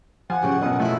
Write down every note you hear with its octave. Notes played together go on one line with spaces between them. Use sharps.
F3 F#5 G#5
F#2 C#3 G4
F#2 B2 D#5
F3 A3 E4